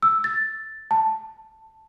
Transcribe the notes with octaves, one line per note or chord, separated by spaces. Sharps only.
E6
A6
A5